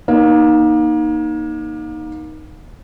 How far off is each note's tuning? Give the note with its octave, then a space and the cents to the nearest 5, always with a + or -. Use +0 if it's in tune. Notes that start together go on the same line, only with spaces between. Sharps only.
A#3 +30 D#4 +0